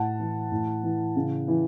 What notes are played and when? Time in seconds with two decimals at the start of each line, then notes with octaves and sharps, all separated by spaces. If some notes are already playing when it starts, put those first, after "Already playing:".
Already playing: A2 F#5 A5
0.20 E3
0.51 A2
0.83 E3
1.16 C#3
1.48 E3